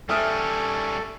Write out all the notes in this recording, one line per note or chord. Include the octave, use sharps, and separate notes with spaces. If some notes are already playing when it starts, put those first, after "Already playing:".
G3 C#4 A4 E5 D#6 F6